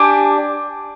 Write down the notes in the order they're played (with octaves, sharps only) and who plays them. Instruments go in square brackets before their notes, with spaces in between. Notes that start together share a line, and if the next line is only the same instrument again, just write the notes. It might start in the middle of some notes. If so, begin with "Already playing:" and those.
Already playing: [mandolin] D4 G4 G#5